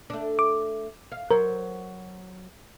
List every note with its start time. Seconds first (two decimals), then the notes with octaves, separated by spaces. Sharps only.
0.10 A3 D4
0.39 D6
1.12 F5
1.31 F#3 A#4 C5